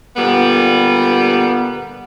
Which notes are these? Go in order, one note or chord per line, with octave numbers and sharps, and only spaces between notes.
A#2 D3 G3 B3